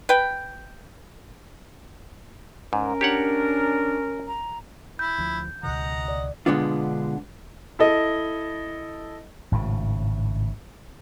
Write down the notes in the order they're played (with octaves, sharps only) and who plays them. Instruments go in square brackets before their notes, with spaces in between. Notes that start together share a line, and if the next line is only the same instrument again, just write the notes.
[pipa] B4 G5
[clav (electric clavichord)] G#2 [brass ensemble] C#4 A#4
[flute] D4 [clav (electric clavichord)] G4 C#5 F#5
[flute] A#5
[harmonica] E4 [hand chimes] G6
[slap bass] D2 F3
[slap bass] C#2 B2 D#3 [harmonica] D#5 F#5 A#5
[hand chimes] D5
[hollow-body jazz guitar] B2 D3 G#3 B3 D4 F4
[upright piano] E4 A4 D#5
[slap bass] G#1 A2 C#3